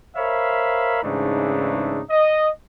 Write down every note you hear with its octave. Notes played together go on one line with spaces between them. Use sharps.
A#4 C5 C#5 E5 F5 B5
G#2 C#3 E3 A3 D4 D#4
D#5